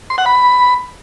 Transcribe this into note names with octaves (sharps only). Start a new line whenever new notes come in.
C6
F#5
B5